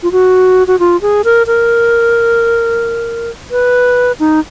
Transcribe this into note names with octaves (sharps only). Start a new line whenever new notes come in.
F4
F#4
F#4
F4
G#4
A#4
A#4
B4
D#4